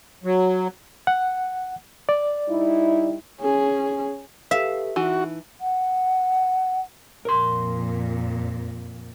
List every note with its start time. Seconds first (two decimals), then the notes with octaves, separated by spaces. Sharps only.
0.24 F#3
1.07 F#5
2.09 D5
2.48 G3 D#4 E4
3.40 C#4 G#4
4.51 G4 A4 B4 E5 F5
4.96 E3 D#4 F#4
5.61 F#5
7.25 F2 A#2 A#4 C6